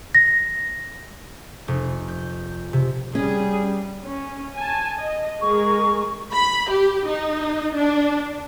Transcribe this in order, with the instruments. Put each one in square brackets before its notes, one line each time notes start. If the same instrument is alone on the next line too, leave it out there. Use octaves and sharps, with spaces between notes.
[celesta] A#6
[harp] F1
G6
C3
[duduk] G3 [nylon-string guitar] C#4 [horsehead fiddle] G#4
[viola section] C#4
G#5 A5
D#5
[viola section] G#3 G#4 A#4 [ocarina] C#6
[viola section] B5
G4
D#4
D4